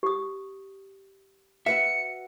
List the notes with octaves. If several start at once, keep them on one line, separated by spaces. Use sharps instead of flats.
G4 D#6
F#4 B4 E5 C#7